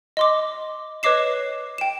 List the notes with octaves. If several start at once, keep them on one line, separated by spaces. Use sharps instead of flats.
D#5 C6 D6
B4 C#5 D#5 D6 C7 E7
G5 E7